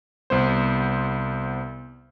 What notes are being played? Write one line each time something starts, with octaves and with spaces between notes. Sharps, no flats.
C2 B3 C5